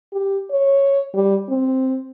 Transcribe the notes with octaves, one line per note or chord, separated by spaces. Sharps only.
G4
C#5
G3
C4